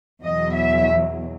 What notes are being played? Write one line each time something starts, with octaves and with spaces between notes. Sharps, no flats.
E2 B2 F#3 D#5
E5